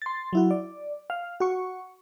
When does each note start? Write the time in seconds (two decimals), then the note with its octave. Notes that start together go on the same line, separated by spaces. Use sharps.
0.02 C6 A6
0.33 F#3 E4 F#4
0.51 D5
1.10 F5
1.40 F#4 C#6